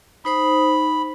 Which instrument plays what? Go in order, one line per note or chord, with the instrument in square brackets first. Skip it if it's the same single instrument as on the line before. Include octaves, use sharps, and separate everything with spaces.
[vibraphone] D#4 C5 D#6 [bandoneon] B5